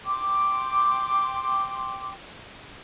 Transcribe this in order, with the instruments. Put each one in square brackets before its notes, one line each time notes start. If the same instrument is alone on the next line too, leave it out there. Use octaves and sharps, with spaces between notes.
[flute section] G5 C6 D6